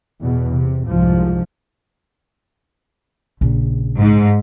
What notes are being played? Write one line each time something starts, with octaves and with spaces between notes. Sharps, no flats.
E2 B2
C3
C2 G#2 F3
A#1 C#3
G#2